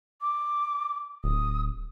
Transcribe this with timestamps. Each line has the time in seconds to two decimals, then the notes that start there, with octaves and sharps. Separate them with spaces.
0.21 D6
1.24 D1 D#6